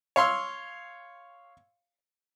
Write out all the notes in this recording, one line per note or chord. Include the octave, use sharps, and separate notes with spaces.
C#5 F5 C6 E6